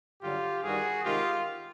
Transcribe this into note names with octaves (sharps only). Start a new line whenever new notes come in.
G2 D3 F#3 F4 G4
G2 D#3 G3 F#4 G#4
C3 D#3 G#3 F4 G4